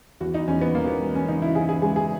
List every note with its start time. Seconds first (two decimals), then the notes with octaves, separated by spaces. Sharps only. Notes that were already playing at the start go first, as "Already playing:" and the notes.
0.21 E2 F#4
0.34 D#4
0.48 E2 C#4
0.61 B3
0.74 E1 A#3
0.88 B3
1.01 G#3
1.15 C#4
1.28 C#3 D#4
1.42 E4
1.55 C#3 G#4
1.69 G#4
1.82 G#3 G#4
1.96 G#4